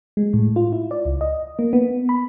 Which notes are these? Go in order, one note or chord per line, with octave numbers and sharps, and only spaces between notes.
G#3
A2
F4
E4
D5
C#2
D#5
A#3
B3
B5